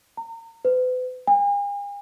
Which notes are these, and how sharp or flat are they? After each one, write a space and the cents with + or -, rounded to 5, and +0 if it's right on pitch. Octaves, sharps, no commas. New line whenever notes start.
A#5 -35
B4 +40
G#5 -45